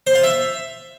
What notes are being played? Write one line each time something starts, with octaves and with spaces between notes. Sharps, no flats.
C5
F4
E5